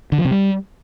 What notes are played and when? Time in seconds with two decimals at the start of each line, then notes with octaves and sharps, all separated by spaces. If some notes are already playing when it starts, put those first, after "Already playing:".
0.12 D3
0.18 F3
0.25 C3
0.31 G3